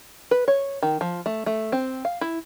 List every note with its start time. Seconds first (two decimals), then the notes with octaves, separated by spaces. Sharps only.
0.31 B4
0.48 C#5
0.83 D#3
1.01 F3
1.26 A3
1.46 A3
1.72 C4
2.05 F5
2.21 E4